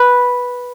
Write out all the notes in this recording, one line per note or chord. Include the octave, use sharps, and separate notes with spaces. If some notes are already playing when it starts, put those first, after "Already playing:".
Already playing: B4